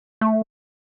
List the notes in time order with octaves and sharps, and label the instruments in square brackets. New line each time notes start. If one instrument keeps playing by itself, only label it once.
[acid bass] A3